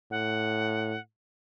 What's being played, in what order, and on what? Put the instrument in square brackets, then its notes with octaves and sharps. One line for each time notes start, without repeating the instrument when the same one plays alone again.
[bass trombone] A2 [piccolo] F#5